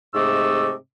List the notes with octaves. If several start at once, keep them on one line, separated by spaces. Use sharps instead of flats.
G#2 C3 A3 D#5 D6 E6